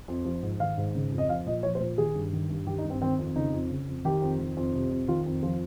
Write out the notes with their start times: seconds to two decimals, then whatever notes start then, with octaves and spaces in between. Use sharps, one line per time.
0.08 F2
0.25 F3
0.42 G#2
0.60 D#3 F5
0.78 G#2
0.95 C#3
1.12 F2
1.18 D#5
1.29 F3 F5
1.46 A#2 D#5
1.63 F3 C#5
1.75 C5
1.81 A#2
1.98 D#3 G#4
2.15 G2
2.33 D#3
2.50 G2
2.67 D#3 G4
2.78 D#4
2.84 G2
2.90 C4
3.02 D#3 C4
3.19 F2
3.36 C#3 D#4
3.53 F2
3.70 C#3
3.88 F2
4.05 D#3 G4
4.22 F2
4.39 D#3
4.57 F2
4.74 C3
4.91 F2
5.08 D#3 F4
5.26 F2
5.43 F3 F4